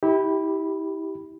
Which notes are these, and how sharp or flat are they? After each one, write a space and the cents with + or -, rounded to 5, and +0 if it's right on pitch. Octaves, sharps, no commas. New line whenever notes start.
E4 -35 G4 +0 B5 +0